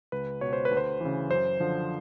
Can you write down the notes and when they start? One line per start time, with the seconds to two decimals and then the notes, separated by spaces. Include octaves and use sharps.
0.12 C#2 B4
0.41 B2 C#5
0.53 C5
0.65 B4
0.71 D2
0.77 C5
1.01 C#3 E3
1.30 F#2 C5
1.60 D3 F3